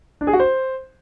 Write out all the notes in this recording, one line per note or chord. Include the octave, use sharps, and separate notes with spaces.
D4
G#4
F#4
C5